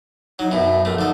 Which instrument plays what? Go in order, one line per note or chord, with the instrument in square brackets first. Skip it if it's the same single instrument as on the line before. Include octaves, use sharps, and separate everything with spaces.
[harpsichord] F#3 [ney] D#4
[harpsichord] F#2 B2 [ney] E5
[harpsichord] A#1 A3 [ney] A#4
[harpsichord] D3 A4 [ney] D#4